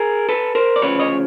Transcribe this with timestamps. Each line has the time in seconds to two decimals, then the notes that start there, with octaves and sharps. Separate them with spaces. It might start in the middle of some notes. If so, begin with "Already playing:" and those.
Already playing: G#4 A#4
0.29 A4 B4
0.55 A#4 C5
0.76 D5
0.82 D2 C#3 F3 B4 C#5
0.99 C#5 D#5